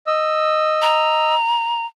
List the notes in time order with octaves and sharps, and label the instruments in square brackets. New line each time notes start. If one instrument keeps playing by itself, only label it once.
[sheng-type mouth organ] D#5 E6
[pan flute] A#5